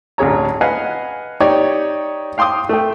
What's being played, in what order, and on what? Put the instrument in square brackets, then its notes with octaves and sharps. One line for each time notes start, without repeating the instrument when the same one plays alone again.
[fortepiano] A1 D2 G#4 C#5 A#5
B4 D#5 F5 F#5 G#5
D#4 G4 C#5 D5
F5 G5 C6 D6 D#6
A3 G5